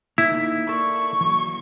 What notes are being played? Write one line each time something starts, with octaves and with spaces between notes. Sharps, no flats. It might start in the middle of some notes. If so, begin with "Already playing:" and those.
A#3 D#4 E4
A4 A#4 D5 C#6
E3 F#3 A#3